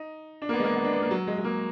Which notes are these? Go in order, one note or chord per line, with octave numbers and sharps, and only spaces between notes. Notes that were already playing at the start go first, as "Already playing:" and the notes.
Already playing: D#4
D4
A#3
B3
G#3
A#3
B3
D4
B3
A#3
F#3
G#3
G#3
A#3